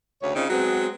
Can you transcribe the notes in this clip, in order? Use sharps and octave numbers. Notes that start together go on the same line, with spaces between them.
D2 C#3 C#5
C#3 C4 D4 D#4 F4
F#3 G#3 B3 C4